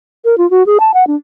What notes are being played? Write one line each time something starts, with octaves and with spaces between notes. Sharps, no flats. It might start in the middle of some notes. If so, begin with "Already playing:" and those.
A#4
F4
F#4
G#4
A5
F#5
D4